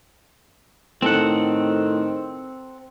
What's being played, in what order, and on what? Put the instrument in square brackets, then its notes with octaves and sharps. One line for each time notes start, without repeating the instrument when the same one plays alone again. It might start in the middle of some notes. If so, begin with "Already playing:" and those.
[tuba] A2 [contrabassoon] D#3 [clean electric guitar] C4 A4 F#5